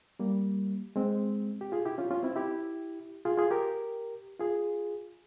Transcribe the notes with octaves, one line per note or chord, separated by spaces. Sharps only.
G3 A#3
G#3 C4
G4
F4 G#4
E4 G4
C#4 F4
C#4 F4
C4 E4
E4 G4
F4 G#4
F4 G#4
G4 A#4
F4 G#4